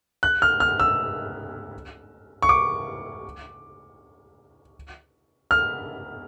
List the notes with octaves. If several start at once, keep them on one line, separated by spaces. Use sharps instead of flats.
F#6
F6
F6
E6
C#6
D6
F6